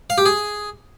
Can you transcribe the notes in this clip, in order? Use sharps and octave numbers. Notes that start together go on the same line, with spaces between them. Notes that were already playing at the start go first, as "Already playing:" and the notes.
F5
G4
G#4